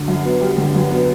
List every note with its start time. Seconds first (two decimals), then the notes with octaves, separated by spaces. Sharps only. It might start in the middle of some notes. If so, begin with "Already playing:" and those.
Already playing: D3 F#3
0.08 F#2
0.25 B3
0.41 G3
0.58 D3
0.75 F#2
0.91 B3